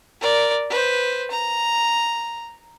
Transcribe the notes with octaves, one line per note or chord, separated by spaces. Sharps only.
A#4 D5
B4 C5
A#5